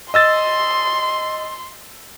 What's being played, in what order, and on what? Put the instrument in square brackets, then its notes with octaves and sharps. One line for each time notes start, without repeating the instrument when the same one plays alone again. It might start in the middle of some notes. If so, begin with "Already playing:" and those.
[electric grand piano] D#5 E6 A6 [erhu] C6